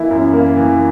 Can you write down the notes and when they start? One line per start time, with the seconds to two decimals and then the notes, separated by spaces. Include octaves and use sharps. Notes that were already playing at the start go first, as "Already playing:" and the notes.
Already playing: E3 A#3 E4
0.11 F#2
0.33 A#3
0.57 E3